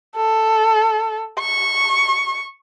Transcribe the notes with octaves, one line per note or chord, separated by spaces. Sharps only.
A4
C#6